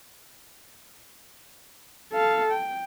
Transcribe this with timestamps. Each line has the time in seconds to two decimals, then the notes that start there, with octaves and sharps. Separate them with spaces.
2.13 A4 F5
2.52 G5